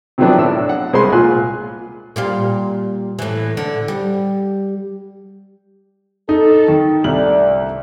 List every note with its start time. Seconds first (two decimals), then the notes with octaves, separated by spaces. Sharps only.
0.18 C3 D#3 F3 F#3 B3 D4
0.38 A2 D4 E6
0.69 F#5
0.93 C2 G#3 C5 B5 C6
1.12 A#2 F4 G#5 F#6
2.16 A#2 G3 F4
3.19 A2 E3
3.57 D3
3.88 G3
6.29 D#4 A4
6.68 D#3
7.04 C2 D3 A3 D5 F#7